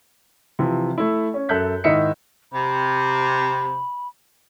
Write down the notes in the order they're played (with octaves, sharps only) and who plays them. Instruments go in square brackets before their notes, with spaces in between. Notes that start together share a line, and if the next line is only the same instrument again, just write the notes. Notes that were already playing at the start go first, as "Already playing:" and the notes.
[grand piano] C3 E3 F3
A3 E4
C#4
F#2 A4 E5 F#6 G6 B6
G#2 D#3 E4 D#5 E5 C#7
[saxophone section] C3 [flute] B5